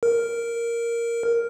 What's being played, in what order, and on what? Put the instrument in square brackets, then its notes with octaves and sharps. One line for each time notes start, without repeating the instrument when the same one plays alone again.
[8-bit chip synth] A#4